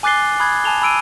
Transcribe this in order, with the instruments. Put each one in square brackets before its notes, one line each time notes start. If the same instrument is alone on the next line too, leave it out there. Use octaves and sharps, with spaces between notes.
[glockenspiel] G#5 D6 F#6 A6 C7 G7
B5 D#6 F#6 G#6
G#5 A5 F7 G7
B5 E6 D7 D#7